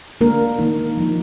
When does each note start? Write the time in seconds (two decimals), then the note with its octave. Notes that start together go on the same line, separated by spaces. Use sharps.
0.21 D3 G#3 A#3 D4 A#4
0.59 D#3 A#3 D#4
0.97 F3 A#3 D#4